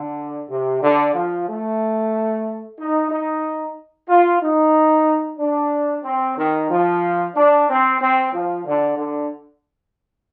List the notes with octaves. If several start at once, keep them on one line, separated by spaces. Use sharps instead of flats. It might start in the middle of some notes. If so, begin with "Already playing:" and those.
Already playing: D3
C3
D3
F3
A3
D#4
D#4
F4
D#4
D4
C4
D#3
F3
D4
C4
C4
F3
D3
D3